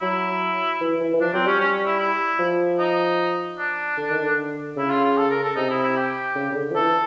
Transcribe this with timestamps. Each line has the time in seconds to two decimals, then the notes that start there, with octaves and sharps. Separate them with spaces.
0.01 F#3 E4
0.81 E3
1.01 E3
1.14 E3
1.20 F3 D4
1.34 F#3 C4
1.46 G3 C#4
1.60 C#4
1.86 E4
1.99 E4
2.39 F3
2.79 D#4
3.58 D4
3.97 D3
4.10 D#3
4.21 D3
4.77 C#3 E4
4.90 F4
5.04 F4
5.17 A4
5.30 A#4
5.43 A4
5.56 C3 D#4
5.70 E4
5.82 E4
5.96 G4
6.36 C#3
6.52 C#3
6.56 D3
6.71 F3
6.75 E3 A4